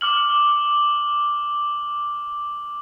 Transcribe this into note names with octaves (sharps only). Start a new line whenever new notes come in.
D6 F6 F#7